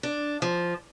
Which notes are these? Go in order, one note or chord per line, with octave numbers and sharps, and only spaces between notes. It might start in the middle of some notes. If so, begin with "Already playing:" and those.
D4
F3